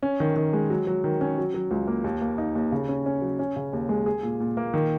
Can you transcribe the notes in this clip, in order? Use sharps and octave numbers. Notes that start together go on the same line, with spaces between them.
C#4
D#3
D#3
G#3
F#3
F#3
D#3
C#4
F#3
F#3
C#2
A#3
D#2
A#3
D#4
D#2
C#3
C#4
C#4
F#3
C#4
C#3
D#2
G#3
G#4
A#2
A#2
A#3
D#3